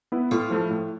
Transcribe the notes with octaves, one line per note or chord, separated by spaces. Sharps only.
B3 E4 B4
A2 F4
F3 A3 E4
A2